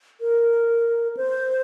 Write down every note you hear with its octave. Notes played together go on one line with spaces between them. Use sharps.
A#4
C5